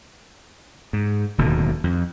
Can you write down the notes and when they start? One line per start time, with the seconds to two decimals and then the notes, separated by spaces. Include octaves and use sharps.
0.93 G#2
1.38 D1 D#2 B2 D3
1.84 F2